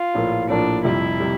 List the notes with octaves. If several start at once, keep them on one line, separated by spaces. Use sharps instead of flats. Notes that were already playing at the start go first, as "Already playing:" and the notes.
Already playing: F4
A#1 A2 F3 A#3
A#1 A2 F3 A#3 D4
F1 F2 C3 G3 E4
C3 G3